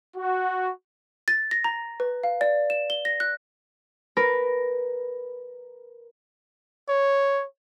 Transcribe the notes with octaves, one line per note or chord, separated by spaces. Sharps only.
F#4
A6
A#6
A#5
B4
F5
D5
E7
G7
A#6
F#6
A#4 B4 B5
C#5